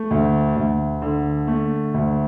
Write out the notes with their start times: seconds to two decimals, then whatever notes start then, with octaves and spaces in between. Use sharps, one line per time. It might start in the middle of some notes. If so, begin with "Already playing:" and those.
Already playing: A3
0.11 D2
0.56 D2
1.02 D3
1.47 A3
1.94 D2